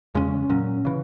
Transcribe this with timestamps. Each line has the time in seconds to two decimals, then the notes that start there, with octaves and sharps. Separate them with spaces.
0.15 E2 C#3 G#3 C#4
0.49 A#2 F#3 C#4
0.85 C#3 E3